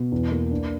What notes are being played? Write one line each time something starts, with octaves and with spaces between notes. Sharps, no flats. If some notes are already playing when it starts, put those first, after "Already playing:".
Already playing: B2
E2
A#3
D4